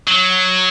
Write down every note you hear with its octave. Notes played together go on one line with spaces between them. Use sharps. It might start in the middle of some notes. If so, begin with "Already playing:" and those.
F#3